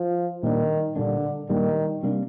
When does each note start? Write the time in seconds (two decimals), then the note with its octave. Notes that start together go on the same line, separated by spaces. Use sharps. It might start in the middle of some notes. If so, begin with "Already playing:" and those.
Already playing: F3
0.43 A#2 D#3 G3 D4
0.96 A#2 D3 G3 A#3 D4
1.49 A#2 D#3 G3 A#3 D4
2.03 C3 G3 A#3 D4